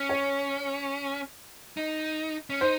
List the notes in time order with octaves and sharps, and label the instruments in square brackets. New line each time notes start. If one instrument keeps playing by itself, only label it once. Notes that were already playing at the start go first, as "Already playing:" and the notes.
Already playing: [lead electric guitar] C#4
[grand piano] C#5
[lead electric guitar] D#4
C#4
[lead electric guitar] D#4 [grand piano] C5